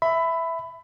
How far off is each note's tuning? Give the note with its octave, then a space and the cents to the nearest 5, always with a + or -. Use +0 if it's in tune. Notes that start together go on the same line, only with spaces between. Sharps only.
E5 +0 B5 +20